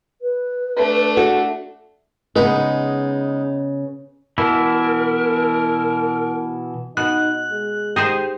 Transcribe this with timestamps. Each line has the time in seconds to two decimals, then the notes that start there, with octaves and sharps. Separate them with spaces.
0.22 B4
0.76 A3 D4
1.17 F#4 A4
2.36 C#3 G#3 B3 D#4 B4
4.38 B2 E3 E4 A#4
6.97 B2 D#4 F#6
7.51 G#3
7.96 D#4 G4 G#4 C5